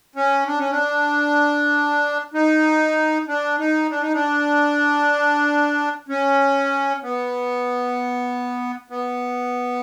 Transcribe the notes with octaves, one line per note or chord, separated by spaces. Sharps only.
C#4
D4
C#4
D4
D#4
D4
D#4
D4
D#4
D4
C#4
B3
B3